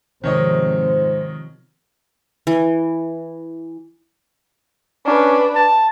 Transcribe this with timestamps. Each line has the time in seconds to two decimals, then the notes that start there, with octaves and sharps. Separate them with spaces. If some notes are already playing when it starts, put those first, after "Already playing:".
0.24 G#2 C3 D#3 F3 C5 C#5 D#5
2.47 E3
5.06 C#4 D4 B4
5.56 A5